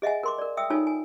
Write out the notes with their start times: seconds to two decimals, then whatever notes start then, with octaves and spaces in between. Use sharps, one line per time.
0.02 G#4 D#5 E5 F#5 G#5
0.23 A#4 C6 D6
0.38 A#4 D5
0.57 E5 G5 D#6 E6
0.70 D#4 F4 A4 C#5 G#5 E6
0.87 G#5